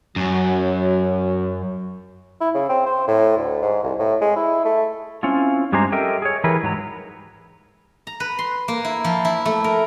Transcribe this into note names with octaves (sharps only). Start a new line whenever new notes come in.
F#2 F#3 C#4
E4
C#3
C4
C5
A2
D2
G#2
C2
A2
G#3
E4
A3
C4 C#4 E4 F4
G2 G#3 G4 G#4 C5 A#5
G4 A4 A#4 D#5 E5 G5
G#4 C#5
E3 E4 G4 G#4 A#4 B4
G#2 F#3 A#5
A#5
B4
C6
A#3
E4
F3
E4
A3
A#4